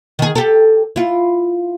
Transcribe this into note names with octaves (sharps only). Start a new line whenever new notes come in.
D#3 G#4
G4 A4
E4 F4